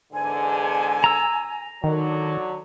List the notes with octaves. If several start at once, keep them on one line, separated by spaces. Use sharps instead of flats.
E2 G#2 D3 G#5
A#5 E6
D3 D#3 F#3